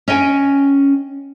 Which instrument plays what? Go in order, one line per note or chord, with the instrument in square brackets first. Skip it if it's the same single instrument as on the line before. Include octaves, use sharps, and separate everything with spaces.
[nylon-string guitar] C#4 D#5 G5 G#5